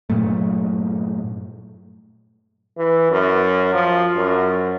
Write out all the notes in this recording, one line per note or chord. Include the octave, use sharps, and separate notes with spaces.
G2 A#2 F#3 A3
E3
F#2
F3
F#2